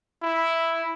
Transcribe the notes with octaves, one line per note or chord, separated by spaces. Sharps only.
E4